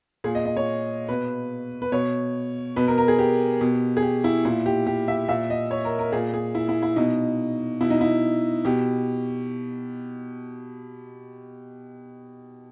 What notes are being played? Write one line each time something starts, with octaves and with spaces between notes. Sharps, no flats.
A#2 G#4
D#5
D#5
C#5
B2 B4
B4
B2 C#5
B2 B4
A#4
A#4
G#4
G4
B2
G#4
G4
E4
A#2 E4
G4
G4
E5
A#2 E5
D#5
C#5
A#4
A#4
A#2 G#4
G#4
E4
E4
E4
B2 D#4
B2 E4
D#4
E4
B2 G4